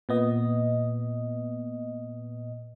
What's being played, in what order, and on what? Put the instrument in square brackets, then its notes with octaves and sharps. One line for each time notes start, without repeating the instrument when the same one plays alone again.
[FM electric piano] A#2 B3 D#5